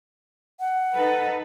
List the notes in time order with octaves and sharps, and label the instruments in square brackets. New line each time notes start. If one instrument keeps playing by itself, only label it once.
[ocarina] F#5
[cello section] D#4 A4 B4